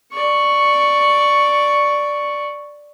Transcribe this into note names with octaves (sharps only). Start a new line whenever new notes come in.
D5 C#6